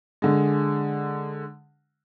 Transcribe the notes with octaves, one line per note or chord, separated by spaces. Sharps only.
D3 G#3